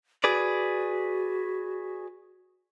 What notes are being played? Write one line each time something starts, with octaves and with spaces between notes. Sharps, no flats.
F#4 G#4 B4 D5